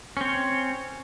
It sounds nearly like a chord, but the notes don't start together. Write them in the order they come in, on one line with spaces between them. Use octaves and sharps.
C#4 C4 C#5